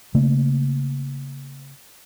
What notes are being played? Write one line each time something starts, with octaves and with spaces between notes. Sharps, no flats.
C#3 A3 A#3